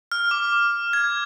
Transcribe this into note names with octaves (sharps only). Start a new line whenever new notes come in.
F6
D6
G#6